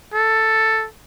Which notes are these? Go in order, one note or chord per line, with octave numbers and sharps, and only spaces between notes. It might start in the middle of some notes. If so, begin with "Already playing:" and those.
A4